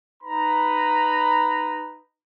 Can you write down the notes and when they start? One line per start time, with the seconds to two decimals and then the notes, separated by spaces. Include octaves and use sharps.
0.23 D#4 B4 A#5 B5